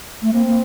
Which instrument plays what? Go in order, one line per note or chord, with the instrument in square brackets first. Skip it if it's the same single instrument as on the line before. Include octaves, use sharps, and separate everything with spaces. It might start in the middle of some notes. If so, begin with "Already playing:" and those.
[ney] A3
[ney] A#3 [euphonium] C4
[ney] A#3